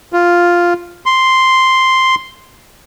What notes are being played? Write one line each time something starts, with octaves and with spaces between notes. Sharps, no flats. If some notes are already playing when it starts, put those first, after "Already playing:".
F4
C6